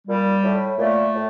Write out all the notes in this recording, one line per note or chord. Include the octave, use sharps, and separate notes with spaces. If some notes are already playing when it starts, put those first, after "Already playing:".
A#2 G3
A2
A#2 A3
A2